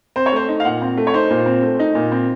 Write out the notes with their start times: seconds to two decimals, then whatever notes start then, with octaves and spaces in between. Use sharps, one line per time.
0.16 C4 C5
0.26 C#5
0.32 A3 C5
0.49 D#4
0.60 F5
0.65 A#2 F#5
0.82 C4
0.97 A3
1.07 C#5
1.14 D#4 C5
1.30 A#2
1.46 C4
1.63 A3
1.79 D#4
1.95 A#2
2.12 C4